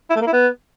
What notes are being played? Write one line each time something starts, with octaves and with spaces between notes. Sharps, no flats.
E4
A3
A#3
E4
B3